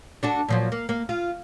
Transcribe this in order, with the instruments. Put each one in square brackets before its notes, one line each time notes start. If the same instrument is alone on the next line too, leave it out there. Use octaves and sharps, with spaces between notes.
[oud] D4 F#4 A4
A#2 F3 F#3
A#3
A#3
F4